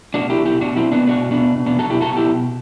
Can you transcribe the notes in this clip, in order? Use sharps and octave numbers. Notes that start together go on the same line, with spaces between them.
B2 D4 F#4
E4 G4
B2
E4 G4
B2 D4 F#4
C4 E4
B2
B3 D4
B2 D4 F#4
B2 B3 D4
B2
B3 D4
B2 F#4 A4
E4 G4
B2 F#4 A4
E4 G4
B2